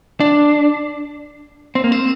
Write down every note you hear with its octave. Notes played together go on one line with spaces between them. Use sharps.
D4
C4
A#3
C4